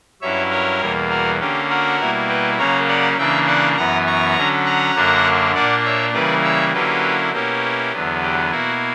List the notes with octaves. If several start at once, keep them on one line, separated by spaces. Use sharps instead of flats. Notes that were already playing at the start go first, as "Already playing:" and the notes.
G2 F#3 C#4 E4 C#5 E5
A#4 C#5
E2 B2 G3 A#3
F#4 A#4
D3 A#3 C#4 G4
F#4 A#4
B2 G3 A#3 E4
G4 B4
C#3 F#3 A#3 C#4 A#4 C#5
D5 F#5
C#3 E3 A#3 D4 E5 G5
D5 F#5
F#2 E3 B3 F#5 A#5
A#5 C#6
D3 F#3 C#4
F#5 A#5
F#2 D3 F#3 A#3 D4
A#2 A#3 D4 D5 F#5
C#5 E5
C#3 E3 G3 A#3 E4 B4 D5
C#5 E5
D3 F#3 A#3 C#4 E4 G4 B4
B2 A#3 C#4 E4 G4
E2 D3 F#3 B3
G4
B2 A#3 E4 F#4